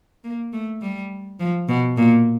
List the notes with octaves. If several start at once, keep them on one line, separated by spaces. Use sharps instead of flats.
A#3
A3
G3
F3
B2
A#2